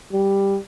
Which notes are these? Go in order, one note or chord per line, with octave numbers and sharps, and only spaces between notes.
G3